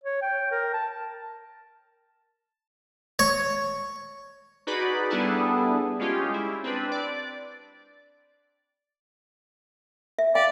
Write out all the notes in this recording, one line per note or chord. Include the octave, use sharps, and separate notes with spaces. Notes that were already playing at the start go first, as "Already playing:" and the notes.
C#5
G5
A#4
A5
C#5
D#4 F#4 G#4 B4 D5 B5
G3 B3 D4 E4 G#4 A4
G#3 C#4 F4 G4 G#4
E4
C4 D4 B4
D5
E5
D5 F5 G5